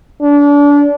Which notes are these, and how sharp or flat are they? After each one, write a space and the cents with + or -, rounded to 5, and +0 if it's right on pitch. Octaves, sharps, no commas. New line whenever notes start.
D4 -30